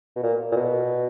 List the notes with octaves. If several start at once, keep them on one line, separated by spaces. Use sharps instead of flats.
B2
A#2
A#2
B2